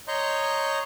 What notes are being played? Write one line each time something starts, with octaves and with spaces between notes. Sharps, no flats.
C#5 D#5 A#5 C6 C#6 G6